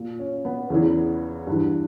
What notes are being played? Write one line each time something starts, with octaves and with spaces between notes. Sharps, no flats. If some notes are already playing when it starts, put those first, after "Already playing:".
Already playing: A#2
C#4
B3
E2 C#3 E3
G2 E3